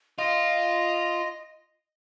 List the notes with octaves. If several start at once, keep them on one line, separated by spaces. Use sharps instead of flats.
F4 D#5